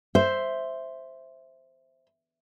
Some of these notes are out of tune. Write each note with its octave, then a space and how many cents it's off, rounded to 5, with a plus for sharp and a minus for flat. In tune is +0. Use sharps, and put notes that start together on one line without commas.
C5 +0 E5 +0